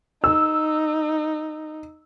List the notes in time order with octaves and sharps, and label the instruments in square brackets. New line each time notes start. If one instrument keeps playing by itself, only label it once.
[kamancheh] D#4 [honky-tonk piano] E6